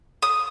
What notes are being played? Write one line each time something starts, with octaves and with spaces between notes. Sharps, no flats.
D#6